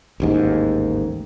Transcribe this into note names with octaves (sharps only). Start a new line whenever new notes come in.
A1 D#2 G#2